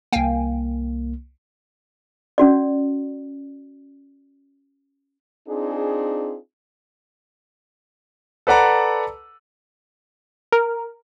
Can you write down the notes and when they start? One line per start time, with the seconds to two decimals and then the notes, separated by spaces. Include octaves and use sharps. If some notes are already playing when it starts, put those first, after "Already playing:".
0.13 C2 A#3 F5 G5 G#5
2.38 C#4 F#4 D5
5.48 C4 D4 D#4 F4 G#4
8.47 A4 B4 D5 F#5 A#5
10.53 A#4